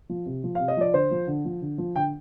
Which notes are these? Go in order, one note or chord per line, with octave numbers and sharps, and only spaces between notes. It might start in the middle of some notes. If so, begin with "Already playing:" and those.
F3
C3
F3
C3 F5
D#5
F3 D5
D3 C5
F3
D3
F3
D3
F3
D3 G5